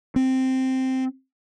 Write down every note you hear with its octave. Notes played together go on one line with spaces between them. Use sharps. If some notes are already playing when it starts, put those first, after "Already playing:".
C4